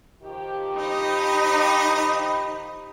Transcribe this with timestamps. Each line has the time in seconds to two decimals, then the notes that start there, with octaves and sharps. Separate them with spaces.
0.23 D#3 F3 G4
0.77 D#4 D#5 B5